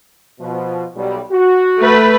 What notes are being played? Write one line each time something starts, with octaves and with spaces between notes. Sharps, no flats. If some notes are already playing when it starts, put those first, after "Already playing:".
B2 F3
B1 G3
F#4
A3 B4